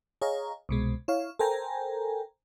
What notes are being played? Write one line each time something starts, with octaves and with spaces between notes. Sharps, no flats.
G#4 C#5 D#5 F5 A#5
C2 B2 G#3
E4 C#5 F5
A4 A#4 C5 G5 G#5 A#5